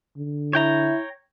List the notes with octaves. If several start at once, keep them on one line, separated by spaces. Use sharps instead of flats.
D3
E4 C#5 G5 A#5